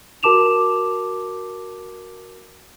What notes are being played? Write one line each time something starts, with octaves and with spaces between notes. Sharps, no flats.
F#4 A#4 A5 D6 E7 F7